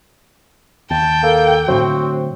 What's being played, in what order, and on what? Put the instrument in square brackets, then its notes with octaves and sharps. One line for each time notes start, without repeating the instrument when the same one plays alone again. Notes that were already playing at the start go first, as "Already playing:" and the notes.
[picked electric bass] D#2 [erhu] G5 [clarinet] A5
[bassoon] A#3 [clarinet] A4
[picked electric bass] A2 D3 F#3 [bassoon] C4 [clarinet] F#4